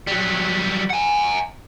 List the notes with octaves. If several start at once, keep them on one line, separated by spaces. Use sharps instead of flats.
F#3 G3
F#5 G#5